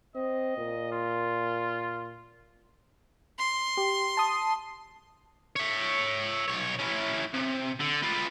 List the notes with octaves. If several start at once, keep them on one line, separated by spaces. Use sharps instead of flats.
C4 D#5
A#2
F4
C6
G4
A5 D#6
C#5 E5
B1 C#5
C#4 E4
C3
D3
F4 B4